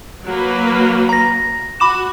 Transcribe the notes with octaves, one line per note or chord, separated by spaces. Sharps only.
F#3 A#3 B4
A#5 A#6
F#4 B5 D6 E7